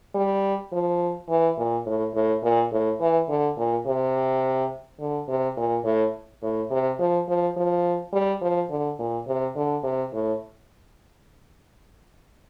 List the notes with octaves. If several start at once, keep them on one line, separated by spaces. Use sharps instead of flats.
G3
F3
E3
A#2
A2
A2
A#2
A2
E3
D3
A#2
C3
D3
C3
A#2
A2
A2
C3
F3
F3
F3
G3
F3
D3
A#2
C3
D3
C3
A2